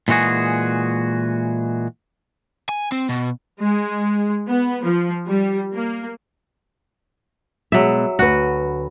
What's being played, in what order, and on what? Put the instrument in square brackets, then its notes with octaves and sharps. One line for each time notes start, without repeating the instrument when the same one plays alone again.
[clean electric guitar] A#2 E3 G#3 F#4 G#4
[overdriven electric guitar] G#5
C4
B2
[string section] G#3
B3
F3
G3
A#3
[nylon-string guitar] B2 G#3 [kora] F#3 E5
[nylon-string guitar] D2 B4 [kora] F#4